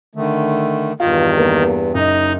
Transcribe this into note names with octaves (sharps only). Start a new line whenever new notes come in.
D3 D#3 A3
E2 G2 D#3 F4
A#3
F#1 D#4 D#5